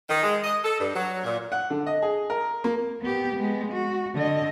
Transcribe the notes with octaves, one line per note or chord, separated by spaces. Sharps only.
D#3
G#3
D#5
A4
G2
F#3
A#2
F#5
D3
D#5
G#4
A#4
A#3
B3 G4
G#3 B3
F#4
D3 D#5